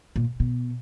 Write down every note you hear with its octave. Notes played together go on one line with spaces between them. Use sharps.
A#2
B2